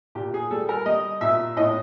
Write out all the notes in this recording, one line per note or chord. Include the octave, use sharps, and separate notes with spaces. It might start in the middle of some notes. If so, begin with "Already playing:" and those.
A#2 G4
G#4
G3 A4
A#4
G3 D#5
A#2 E5
A2 D#5